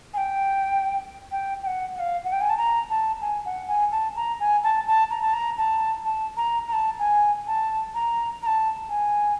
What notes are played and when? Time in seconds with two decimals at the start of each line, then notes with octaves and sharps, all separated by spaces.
0.14 G#5
0.17 G5
1.32 G5
1.63 G5
1.67 F#5
1.95 F#5
2.00 F5
2.25 F#5
2.32 G5
2.41 G#5
2.50 A5
2.58 A#5
2.90 A5
3.21 G#5
3.45 F#5
3.68 G#5
3.92 A5
4.16 A#5
4.40 G#5
4.64 A5
4.87 A5
5.10 A#5
5.22 A5
5.34 A#5
5.58 A5
6.05 A5
6.37 A#5
6.68 A#5
6.73 A5
6.99 G#5
7.47 A5
7.95 A#5
8.42 A#5
8.47 A5
8.89 G#5